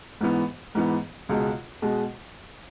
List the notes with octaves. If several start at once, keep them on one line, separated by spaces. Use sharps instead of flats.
G#2 E3 B3
G#2 E3 B3
C#2 B2 G#3
B2 G#3